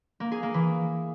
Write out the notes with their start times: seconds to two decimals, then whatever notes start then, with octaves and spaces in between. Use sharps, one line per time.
0.20 A#3
0.32 G#4
0.43 A#3
0.54 E3